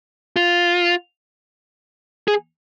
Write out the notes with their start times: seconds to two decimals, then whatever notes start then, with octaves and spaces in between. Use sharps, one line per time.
0.36 F4
2.28 G#4